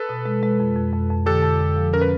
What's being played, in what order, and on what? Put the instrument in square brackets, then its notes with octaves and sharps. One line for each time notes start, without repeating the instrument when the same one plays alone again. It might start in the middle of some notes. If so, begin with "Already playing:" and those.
Already playing: [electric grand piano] A4 B4
[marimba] B2
G#3
G#3
F2
F2
F2
F2
[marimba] D3 [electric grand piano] G4 A4
[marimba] F2
F2
F3
[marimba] C#4 [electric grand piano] A#4
[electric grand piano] B4